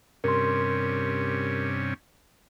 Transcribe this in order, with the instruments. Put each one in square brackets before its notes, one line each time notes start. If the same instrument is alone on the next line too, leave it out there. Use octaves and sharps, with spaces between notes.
[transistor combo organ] G2 C3 C#4 [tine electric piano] A#4 C6